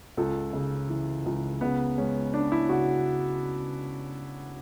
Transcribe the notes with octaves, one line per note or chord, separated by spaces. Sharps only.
C#2 A4
C#3
E3
C#2
C#3 B3
G#3 C#4
C#4 D4
E4
C#3 F#4